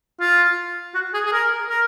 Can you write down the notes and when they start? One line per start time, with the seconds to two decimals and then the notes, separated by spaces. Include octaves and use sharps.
0.20 F4
0.94 F#4
1.14 G#4
1.26 G#4
1.32 A#4
1.69 A#4